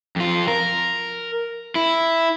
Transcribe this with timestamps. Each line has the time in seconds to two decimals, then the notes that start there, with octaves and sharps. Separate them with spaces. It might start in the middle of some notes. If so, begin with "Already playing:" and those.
0.16 F2 F4
0.48 A#4
1.75 E4